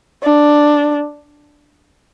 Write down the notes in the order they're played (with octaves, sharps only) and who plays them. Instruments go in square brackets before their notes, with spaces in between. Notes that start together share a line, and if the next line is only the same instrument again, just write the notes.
[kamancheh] D4